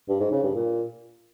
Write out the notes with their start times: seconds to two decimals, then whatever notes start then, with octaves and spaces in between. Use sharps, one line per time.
0.09 G2
0.20 G#2
0.32 C#3
0.43 G2
0.55 A#2